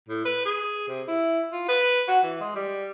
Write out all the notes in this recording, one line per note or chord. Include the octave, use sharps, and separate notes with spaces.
A2
B4
G#4
C3
E4
F4
B4
F#4
E3
G#3
G3